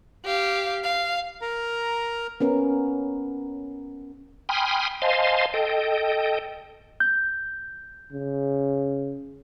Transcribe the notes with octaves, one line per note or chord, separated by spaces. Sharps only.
G4 F5
F5
A#4 A#5
B3 C#4 A#4
G5 G#5 B5 C6 D#6 F6
C5 D#5 F5 G#5 A5 C6
A4 D#5 G5
G6
C#3